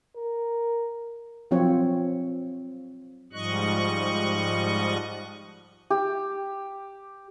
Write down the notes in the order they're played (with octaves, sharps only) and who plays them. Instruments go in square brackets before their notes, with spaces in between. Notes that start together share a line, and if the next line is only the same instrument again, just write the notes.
[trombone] A#4
[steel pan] F3 F#3 C4 F4 C#5
[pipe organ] G#2 F3 G3 D#5 C#6 F#6
[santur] G4